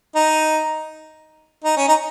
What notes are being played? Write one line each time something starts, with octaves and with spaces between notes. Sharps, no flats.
D#4
D#4
C#4
D#4